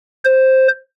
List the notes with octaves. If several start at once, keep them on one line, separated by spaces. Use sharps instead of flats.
C5